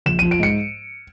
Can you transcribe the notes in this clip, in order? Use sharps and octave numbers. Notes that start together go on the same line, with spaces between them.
A#1 E7
F3 D#7
D7
G#2 C#7